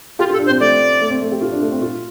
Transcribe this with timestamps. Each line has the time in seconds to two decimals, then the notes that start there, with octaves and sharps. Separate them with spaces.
0.19 F4 G4
0.30 F4 A4
0.39 D4
0.46 C5
0.50 C4
0.60 A3 D5
1.01 A3
1.10 C4
1.21 A3
1.32 G4
1.41 F4
1.52 D4
1.61 A3
1.72 C4
1.82 F4